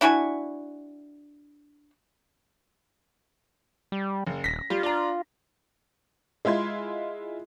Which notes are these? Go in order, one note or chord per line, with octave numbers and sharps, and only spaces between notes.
D4 E4 F#4 G#5
G3
F#1
D#1 A#6 B6
G3 F4
D4 F4 A#5
G#3 E4 F4 C6 G#6